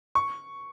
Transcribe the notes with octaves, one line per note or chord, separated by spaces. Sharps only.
C#6